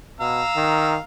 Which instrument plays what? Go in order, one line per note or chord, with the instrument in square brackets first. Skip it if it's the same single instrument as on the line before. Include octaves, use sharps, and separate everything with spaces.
[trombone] B2 [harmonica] F5 A#5 E6
[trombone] D#3